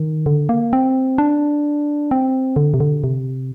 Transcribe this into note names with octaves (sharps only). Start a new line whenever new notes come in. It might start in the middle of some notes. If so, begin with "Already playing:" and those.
Already playing: D#3
D3
A#3
C4
D4
C4
D3
C3
D3
C3